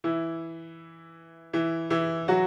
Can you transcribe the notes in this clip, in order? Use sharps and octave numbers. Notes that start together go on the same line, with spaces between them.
E3 E4
E3 E4
E3 E4
F#3 F#4